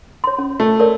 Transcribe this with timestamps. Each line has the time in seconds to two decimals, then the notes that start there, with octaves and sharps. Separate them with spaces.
0.24 C#5 C6
0.38 C#4
0.60 A3
0.80 A#4 C#5 D5